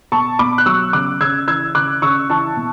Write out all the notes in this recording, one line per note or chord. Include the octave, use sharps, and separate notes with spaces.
B2 A5 C#6
B2 B5 D6
F#6
F#3 C#6 E6
C#3 D6 F#6
C#3 E6 G#6
E3 E6 G#6
C#3 D6 F#6
C#3 C#6 E6
E3 A5 C#6
B2